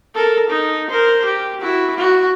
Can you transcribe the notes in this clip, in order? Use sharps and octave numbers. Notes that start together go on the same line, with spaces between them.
A4 A#4
D#4
A#4 C5
G4
E4 F#4
F#4